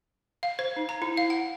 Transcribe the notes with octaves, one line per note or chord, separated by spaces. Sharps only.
F5
C5
D#4
A#5
E4
F5
F#5